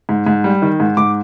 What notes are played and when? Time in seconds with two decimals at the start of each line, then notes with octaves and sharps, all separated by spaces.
0.09 G#2
0.26 G#2
0.44 G3
0.62 D#3
0.80 G#2
0.97 G#2 D6